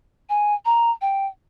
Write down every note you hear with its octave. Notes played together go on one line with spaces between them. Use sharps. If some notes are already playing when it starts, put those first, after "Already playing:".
G#5
A#5
G5